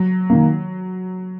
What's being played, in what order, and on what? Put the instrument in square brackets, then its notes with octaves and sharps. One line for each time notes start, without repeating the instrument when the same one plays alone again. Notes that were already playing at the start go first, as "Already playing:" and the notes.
Already playing: [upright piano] F#3
[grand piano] D#3 A#3